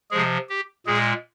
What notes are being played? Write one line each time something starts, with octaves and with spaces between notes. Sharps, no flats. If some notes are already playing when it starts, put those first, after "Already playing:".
C3 F3 G#3 G#4
G4
A#2 G#3 G#4